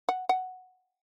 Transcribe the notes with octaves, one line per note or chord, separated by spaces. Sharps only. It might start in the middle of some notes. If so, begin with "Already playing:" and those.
F#5
F#5